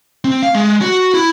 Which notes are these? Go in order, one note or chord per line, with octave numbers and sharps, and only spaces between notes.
C4
F5
G#3
F#4
E4